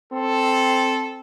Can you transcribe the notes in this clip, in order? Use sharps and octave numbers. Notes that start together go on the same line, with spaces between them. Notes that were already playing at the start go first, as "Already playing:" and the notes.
C4 A4